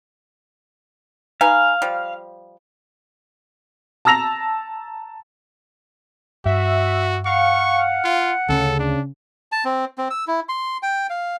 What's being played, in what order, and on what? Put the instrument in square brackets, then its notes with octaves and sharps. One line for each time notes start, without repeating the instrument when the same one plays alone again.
[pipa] D#4 B4 G#5 [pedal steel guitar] F5
[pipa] F3 G3
[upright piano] A5 A#5 E6 A#6 F7
[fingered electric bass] G2 [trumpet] F#4 [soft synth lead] E5
[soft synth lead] F5 [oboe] F#5 [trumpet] C#6
[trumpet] F4
[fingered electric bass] D2 C#4 [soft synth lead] C#3 [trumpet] A4
[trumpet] D4
[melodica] A5
C4
C4
E6
E4
C6
G5
F5